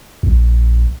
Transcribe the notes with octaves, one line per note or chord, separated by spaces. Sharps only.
A#1